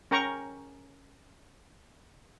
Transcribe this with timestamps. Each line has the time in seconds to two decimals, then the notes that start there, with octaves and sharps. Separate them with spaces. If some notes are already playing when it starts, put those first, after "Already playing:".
0.11 C#4 A#4 G5 A#5 C#6